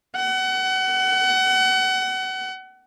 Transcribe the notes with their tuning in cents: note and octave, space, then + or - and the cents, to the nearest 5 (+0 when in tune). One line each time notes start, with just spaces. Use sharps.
F#5 +30